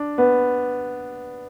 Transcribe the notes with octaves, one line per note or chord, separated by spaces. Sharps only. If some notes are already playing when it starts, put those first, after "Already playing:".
Already playing: D4
B3